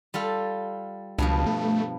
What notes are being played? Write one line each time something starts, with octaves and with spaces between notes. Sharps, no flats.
G3 F4 A4
C#2 G2 B2 F3
A3